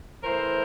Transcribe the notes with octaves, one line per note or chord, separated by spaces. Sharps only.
A2 E3 A#4 C5